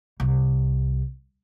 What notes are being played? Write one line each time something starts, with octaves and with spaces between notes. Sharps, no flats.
C2